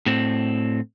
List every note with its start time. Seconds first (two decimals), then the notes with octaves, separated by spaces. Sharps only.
0.06 A2 C4